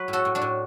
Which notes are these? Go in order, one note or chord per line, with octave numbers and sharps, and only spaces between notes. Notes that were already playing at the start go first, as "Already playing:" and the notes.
Already playing: F#3 B4
A2
F#4 A4
A2
D4 F#4
A2